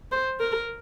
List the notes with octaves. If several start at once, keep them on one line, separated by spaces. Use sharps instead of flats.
C5
A#4